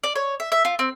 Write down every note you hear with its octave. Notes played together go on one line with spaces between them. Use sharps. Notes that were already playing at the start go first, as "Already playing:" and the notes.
D5
C#5
E5
E5
F4
C4